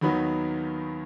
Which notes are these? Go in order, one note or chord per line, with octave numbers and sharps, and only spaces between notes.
D#2 D#3 F#3 B3 D#4 B5